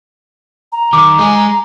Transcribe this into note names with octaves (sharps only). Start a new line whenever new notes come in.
A#5
D#3 D6
G#3 G#4